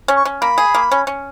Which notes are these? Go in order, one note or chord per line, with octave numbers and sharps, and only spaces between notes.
C#4
C#6
C#4
A#3 B5
G#4
A#3
C#4
C#4